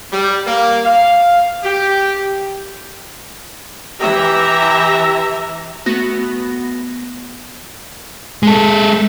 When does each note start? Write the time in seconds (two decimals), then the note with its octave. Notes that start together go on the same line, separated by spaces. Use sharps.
0.13 G3
0.46 A#3
0.84 F5
1.64 G4
4.01 E3 G4 E5 A#5
5.86 A3 B3 F#4 A#6
8.43 G#3 A4